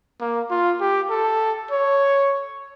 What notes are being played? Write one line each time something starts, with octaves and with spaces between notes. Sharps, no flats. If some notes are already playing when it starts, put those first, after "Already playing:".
A#3
F4
G4
A4
C#5